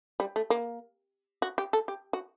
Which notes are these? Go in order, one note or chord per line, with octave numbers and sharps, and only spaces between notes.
G3
A3
A#3
F#4
G4
A4
G4
F#4